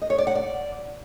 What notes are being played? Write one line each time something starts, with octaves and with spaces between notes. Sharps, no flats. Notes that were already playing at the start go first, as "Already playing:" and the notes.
D#5
C#5
D5
F#5
D5